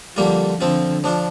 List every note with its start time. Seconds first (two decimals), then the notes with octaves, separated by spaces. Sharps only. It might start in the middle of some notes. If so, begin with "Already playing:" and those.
0.16 D3 F3 G3 A#3 F4
0.61 D3 F3 C4 F4
1.04 F3 D4 F4